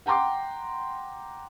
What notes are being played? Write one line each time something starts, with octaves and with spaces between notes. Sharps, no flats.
F#5 G5 A#5 C6 D6